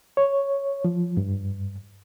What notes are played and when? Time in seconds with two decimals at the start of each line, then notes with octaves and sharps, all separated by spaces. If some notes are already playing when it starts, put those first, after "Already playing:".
0.17 C#5
0.85 F3
1.17 G2